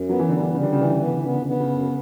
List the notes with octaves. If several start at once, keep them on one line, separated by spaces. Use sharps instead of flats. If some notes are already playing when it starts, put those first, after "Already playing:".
Already playing: F#2
F#3 B3
E3
D3 G3
E3
C#3 G3
D3
C#3
D3 E3
C#3
D3 B3
C#3
D3
C#3 B3
D3
C#3
D3 B3
C#3
F#2